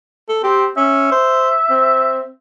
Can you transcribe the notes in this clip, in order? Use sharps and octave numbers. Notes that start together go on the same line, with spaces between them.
A4
C4 G4
C#4 E5
C5
C4